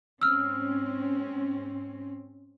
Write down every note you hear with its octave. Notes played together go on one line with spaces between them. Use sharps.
G#2 C4 C#4 E6 F6